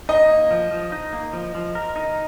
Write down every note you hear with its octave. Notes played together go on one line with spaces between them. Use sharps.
D#4 D#5
A#3
F3
F3
D#4
A#3
F3
F3
A#4
D#4